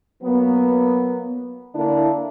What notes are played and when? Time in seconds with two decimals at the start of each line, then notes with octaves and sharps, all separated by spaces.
0.23 F#3 A#3 B3
1.75 D3 A#3 D4 E4